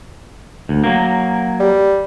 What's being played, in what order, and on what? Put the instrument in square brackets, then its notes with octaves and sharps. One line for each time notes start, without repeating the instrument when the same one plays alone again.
[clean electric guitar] D2
F#3 A#3
[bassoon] G3